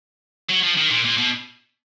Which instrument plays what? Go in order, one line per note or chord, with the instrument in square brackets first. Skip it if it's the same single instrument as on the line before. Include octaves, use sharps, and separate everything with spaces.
[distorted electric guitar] F#3
F3
D#3
A#2
A#2
B2